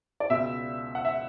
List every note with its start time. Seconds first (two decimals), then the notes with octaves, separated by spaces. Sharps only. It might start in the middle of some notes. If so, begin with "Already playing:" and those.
0.20 D5
0.30 C#2 B2 E5
0.95 F#5
1.05 E5